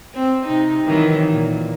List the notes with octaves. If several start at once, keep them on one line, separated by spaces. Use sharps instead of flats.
C4
C3 D#4
D#3 E3 F#3
A#2